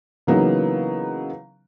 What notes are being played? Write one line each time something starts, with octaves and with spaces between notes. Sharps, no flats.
C#3 E3 F#3 A#3 B3 D#4